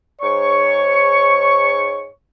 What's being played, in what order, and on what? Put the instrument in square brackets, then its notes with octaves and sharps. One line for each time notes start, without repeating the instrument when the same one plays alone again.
[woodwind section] G#2 C#6 [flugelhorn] C#5